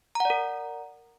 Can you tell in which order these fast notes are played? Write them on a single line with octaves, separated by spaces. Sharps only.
A#5 F#5 D5 A#4